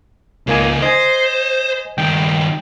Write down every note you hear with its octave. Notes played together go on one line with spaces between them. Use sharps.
C#2 C#3 A#3 D#4 G#5
C5 D#5 G#5
G2 D#3 G5